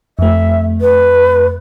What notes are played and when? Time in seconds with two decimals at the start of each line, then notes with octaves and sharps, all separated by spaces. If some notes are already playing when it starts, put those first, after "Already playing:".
0.19 F2 A3 E5
0.81 B4